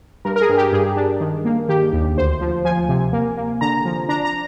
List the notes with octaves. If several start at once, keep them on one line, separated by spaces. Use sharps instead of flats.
G2 A#4
A#4
G#4
G2
G4
G2 G#4
D4
D#3
A#3
D#3 G4
D#2
D2 C5
F3
F3 G#5
C3
A#3
A#3
D3 A#5
F3
D4 A#5
A#5